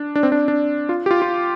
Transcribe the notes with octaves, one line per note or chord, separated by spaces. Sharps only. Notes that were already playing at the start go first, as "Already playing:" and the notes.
Already playing: D4
D4
C4
D4
D4
F4
G4
F4
F4